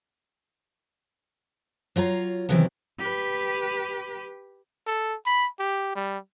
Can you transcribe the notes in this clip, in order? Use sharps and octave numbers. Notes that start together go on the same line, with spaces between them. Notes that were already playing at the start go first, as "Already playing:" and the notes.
F#3 F4 C#5 A#5
C3 D#3 E3 F#3 B3
G4 B4
A4
B5
G4
G3